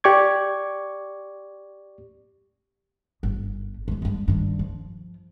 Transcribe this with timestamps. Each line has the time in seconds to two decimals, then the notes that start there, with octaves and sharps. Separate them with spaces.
0.04 G4 D5 C#6 D6 G#6
3.23 G1
3.88 G#3 B3
4.02 G2 G#3
4.28 G2 D#3
4.59 F3